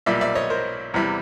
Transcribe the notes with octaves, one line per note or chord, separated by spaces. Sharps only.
B1 A#2 G3 D5 E5
D5 E5
C#5 D#5
A#4 C5
E2 C3 E3 G3